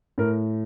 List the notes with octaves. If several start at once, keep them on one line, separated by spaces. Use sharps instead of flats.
A2 A#4